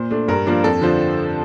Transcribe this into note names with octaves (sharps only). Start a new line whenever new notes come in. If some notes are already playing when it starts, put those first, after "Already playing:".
Already playing: A#2 C5
A3 D4
G2 A#4
F3 A#3 D4
F2 A4
D3 F3 C5